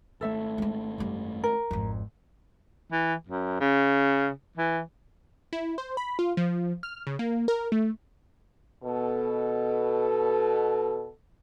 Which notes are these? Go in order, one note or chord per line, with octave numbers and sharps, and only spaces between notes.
G#1 A3 A4 E5
G#3 D4
F#2 G3
A#4
G#1 F2
E3
F#2
C#3
E3
E4
C5
B5
F4
F3
F6
C#3
A#3
A#4
A3
B2 A4